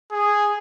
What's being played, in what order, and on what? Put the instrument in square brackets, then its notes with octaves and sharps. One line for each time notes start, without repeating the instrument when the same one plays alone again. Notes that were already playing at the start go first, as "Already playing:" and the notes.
[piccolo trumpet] G#4